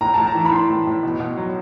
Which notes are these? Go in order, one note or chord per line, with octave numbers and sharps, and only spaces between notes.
A2 A#5
A2 A5
A#5
E3
B5
E3 C6
A2
A2
B2
B2
F#3